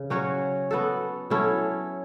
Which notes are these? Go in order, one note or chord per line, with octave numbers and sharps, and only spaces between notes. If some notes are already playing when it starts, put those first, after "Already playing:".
Already playing: C#3
F#3 C#4 F#4 C#5
B3 F#4 A4
F#3 C#4 E4 A4